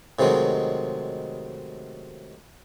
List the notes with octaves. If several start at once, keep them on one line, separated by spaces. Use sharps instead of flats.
A2 C3 D#3 F#3 G#3